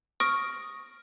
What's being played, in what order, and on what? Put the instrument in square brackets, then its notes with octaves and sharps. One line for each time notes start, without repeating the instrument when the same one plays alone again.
[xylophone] C#6 D#6 F6 A#6 D7